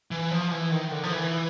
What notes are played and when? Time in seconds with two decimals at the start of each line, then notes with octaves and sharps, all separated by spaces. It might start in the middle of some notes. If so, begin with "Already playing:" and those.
0.11 E3
0.31 F3
0.51 E3
0.71 D#3
0.91 D3
1.03 F3
1.12 E3